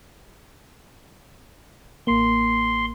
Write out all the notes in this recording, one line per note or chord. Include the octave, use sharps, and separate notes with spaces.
A1 A#3 C6